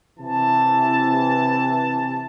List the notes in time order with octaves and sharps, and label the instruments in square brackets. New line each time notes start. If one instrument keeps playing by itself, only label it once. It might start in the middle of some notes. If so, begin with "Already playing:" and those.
[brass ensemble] C3 E3 A5